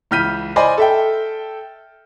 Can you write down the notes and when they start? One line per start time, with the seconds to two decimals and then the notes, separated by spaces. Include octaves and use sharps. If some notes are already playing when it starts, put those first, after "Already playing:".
0.11 C#2 E3 F6 G6 B6 D#7
0.56 C5 D5 D#5 G#5 B5 C6
0.78 A4 E5 G5